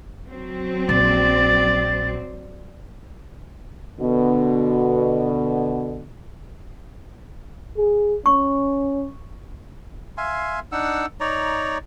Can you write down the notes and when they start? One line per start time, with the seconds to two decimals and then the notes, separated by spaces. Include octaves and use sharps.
0.28 F#3 C4
0.89 A#1 D5 A6
4.00 B2 D3
7.77 G#4
8.26 C#4 C#6
10.17 E5 F5 G#5 C6
10.72 D4 D#4 F#5 E6
11.20 D#4 C#5 D5 A#5